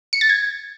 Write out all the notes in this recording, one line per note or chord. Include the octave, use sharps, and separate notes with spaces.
C#7
A6
G#6